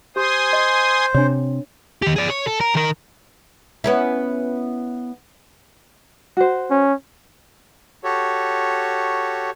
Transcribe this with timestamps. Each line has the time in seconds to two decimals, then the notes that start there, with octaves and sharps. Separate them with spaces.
0.16 G4 C5 G#5 C6 D#6
0.53 D#5
1.14 C3 D4 C#5
2.03 D#3 G4
2.16 G#4 D5
2.30 C#5
2.47 A4
2.61 A#4
2.75 D#3 A#4
3.84 B3 C#4 E4
6.37 F#4 C5
6.70 C#4
8.04 F#4 G4 A4 C#5